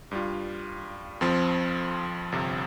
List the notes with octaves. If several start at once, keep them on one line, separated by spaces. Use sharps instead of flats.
G2 G3 F4
F2 F3 C4 F4
G1 F2 C3